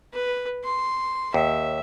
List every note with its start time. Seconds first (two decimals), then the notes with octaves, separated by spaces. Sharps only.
0.13 B4
0.64 C6
1.34 D#2 E5